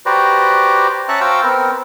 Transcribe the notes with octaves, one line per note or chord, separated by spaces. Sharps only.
F#4 G4 B4 C5 D5 A#5
C#4 E5 A5 A#5 C#6 F#6
F#4 C5 F5 G5 A#5 E6
B3 C4 A#4